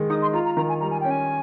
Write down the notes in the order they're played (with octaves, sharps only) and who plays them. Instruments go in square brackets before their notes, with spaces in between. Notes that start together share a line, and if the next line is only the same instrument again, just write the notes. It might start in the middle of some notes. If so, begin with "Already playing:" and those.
Already playing: [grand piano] D#3 G#3
[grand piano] D#4 [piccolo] D#6
[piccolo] C6
[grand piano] F4 [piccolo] A#5
[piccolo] A#5
[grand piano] D#3 [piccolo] A#5
[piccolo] G#5
[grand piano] G3 [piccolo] A#5
[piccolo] G#5
[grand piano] C#4 [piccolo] G5
[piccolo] G#5